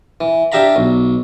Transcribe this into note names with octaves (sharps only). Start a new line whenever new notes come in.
E3
D4 G4 E5 F5 A#5 B5
B1